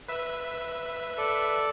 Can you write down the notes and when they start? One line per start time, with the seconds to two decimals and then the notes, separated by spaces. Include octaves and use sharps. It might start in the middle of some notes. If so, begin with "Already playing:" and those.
0.08 B4 E5
1.18 A4 D5